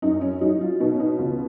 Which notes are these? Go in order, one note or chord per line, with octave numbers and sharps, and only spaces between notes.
F#2 D#4
C#4
F#3 D#4
F4
B2 D#4
C#4
D#4
C#2 F4